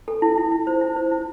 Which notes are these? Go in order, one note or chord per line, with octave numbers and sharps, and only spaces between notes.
A4
E4
E4
E4
C5
E4
C5
E4